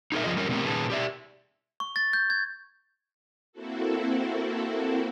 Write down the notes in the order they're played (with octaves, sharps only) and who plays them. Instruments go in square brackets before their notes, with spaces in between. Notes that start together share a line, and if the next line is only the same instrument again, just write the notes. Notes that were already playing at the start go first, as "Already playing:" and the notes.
[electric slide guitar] D#4 G#4 A#4 E5
F2 F3 F4 G#4 D#5
G3 C#4 G4 A#4
C3 A3 B3 C4 G4 A#4
A#2 D#3 C#4 G#4 B4 A5
G4 D5 E5
[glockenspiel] C#6
A6
G6
G#6
[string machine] A#3 C4 E4 F#4 A4